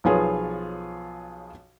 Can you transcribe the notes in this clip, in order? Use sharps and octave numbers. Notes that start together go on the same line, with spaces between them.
B1 F3 B3 F4 G#4 C#5